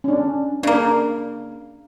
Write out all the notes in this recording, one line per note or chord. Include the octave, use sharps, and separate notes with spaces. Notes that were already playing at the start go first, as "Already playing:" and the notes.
C#4 D4
C#3 A#3 D4